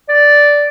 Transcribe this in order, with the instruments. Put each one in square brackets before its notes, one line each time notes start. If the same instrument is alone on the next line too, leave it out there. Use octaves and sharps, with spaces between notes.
[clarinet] D5